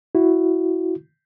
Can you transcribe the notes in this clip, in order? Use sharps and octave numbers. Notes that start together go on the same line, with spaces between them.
E4 F#4